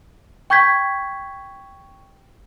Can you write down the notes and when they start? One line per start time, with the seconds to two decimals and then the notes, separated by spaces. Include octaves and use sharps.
0.50 G5 C#6 G6 G#6 B6